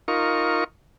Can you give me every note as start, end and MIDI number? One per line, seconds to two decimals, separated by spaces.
0.08 0.64 63
0.08 0.64 65
0.08 0.64 70
0.08 0.64 85